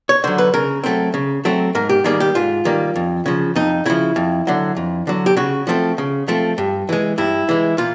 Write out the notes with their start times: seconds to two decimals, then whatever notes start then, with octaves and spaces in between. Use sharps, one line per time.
0.09 C#5
0.24 D3 F#3 C5
0.38 B4
0.54 C#3 A#4
0.84 F#3 A3 C4
1.14 C#3
1.45 F#3 A3 C4
1.75 G#2 A#4
1.89 G4
2.04 D#3 G3 A#3 G#4
2.20 G4
2.35 G#2 F4
2.65 D#3 G3 A#3
2.96 F2
3.26 C#3 F3
3.56 F2 D#4
3.86 C#3 F3 E4
4.16 F2
4.47 D3 F#3
4.76 F2
5.07 D3 F#3
5.26 G4
5.37 C#3 F#4
5.67 F3 A3 C4
5.98 C#3
6.28 F3 A3 C4
6.58 G2
6.89 E3 G#3
7.18 G2 E4
7.49 E3 G#3
7.78 A#2 F4